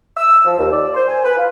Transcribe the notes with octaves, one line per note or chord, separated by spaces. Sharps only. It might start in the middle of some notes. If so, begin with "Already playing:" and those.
E6
F3
D#2
D5
C5
G#5
B4
F4